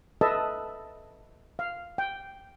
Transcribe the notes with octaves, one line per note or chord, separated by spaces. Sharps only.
A4 B4 D#5 E5 A5
F5
G5